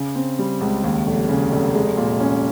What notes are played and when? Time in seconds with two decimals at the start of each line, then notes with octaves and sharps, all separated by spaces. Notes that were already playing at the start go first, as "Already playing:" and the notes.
Already playing: C#3
0.15 C4
0.39 G3
0.61 C#2
0.84 D#2
1.07 F1
1.29 C#3
1.52 F1
1.75 G#3
1.97 A#2
2.20 C#4